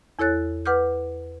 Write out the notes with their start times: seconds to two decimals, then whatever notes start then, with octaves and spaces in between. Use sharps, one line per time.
0.19 E2 E4 A4 C#5 F#6 A6
0.66 B4 F#5 D6 F6 G6